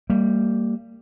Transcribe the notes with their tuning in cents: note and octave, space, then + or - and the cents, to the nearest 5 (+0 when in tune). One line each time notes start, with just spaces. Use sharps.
G3 +0 A#3 -30